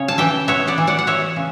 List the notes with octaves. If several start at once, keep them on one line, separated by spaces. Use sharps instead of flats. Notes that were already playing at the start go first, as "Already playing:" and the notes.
Already playing: C#3 C#5
A5
E3 E5 G5
B3 C#5 E5
D5 F#5
E3
D5 F#5
F#5
B3 C#5 E5
C#3